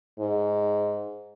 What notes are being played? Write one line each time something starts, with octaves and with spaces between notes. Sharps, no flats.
G#2